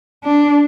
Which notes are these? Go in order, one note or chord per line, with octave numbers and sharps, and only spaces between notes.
D4